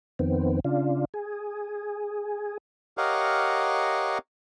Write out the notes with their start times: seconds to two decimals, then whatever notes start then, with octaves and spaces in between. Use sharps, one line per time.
0.19 F2 D#3 B3 C4
0.65 C#3 D4 F4
1.14 G#4
2.97 G4 A#4 C#5 D#5 F5 F#5